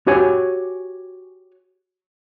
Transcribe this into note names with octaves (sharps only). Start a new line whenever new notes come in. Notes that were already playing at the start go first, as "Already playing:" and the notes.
F#4 G4 C#5 G#5